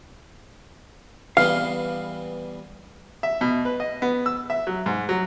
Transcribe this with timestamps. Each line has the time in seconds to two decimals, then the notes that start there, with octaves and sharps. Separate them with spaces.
1.37 E3 G3 B3 F5
3.23 E5
3.41 B2
3.65 B4
3.80 D#5
4.02 B3
4.26 E6
4.50 E5
4.67 F#3
4.86 G#2
5.09 F#3